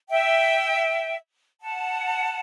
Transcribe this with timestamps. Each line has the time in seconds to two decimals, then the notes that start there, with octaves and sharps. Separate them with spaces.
0.09 E5 G5
1.60 F#5 A5